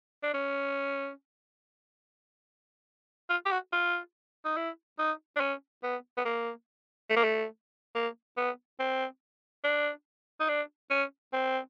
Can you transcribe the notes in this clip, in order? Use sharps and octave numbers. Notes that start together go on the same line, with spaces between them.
D4
C#4
F4
G4
F#4
F4
D#4
E4
D#4
D4
C#4
B3
B3
A#3
A3
A#3
A3
A#3
B3
C4
D4
D#4
D4
C#4
C4